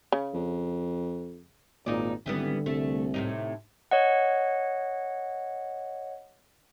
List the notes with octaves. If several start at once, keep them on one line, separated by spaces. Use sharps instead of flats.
C#3
F2
G#1 D#2 A#2 D#4 D5
G#1 D3 E3 G3 B3
C2 A3
A2 C3 D#4
C#5 D#5 F#5